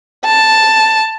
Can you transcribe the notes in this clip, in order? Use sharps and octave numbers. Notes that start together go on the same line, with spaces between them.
A5